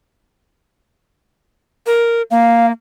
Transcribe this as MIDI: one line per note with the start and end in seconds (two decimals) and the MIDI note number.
1.86 2.22 70
2.31 2.71 58
2.31 2.66 77